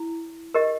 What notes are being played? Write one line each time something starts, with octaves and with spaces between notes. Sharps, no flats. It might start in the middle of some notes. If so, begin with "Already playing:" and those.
Already playing: E4
G4 A#4 D#5